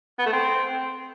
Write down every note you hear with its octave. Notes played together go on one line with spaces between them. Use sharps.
B3
A3
C4